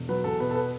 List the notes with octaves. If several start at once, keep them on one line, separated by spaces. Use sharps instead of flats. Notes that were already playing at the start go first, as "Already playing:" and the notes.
Already playing: E1
F#3 B4
E2 A4
B2 B4
A4
B4